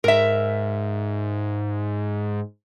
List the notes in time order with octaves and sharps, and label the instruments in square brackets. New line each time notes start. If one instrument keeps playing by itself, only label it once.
[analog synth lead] G#2 [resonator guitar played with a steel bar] A#4 E5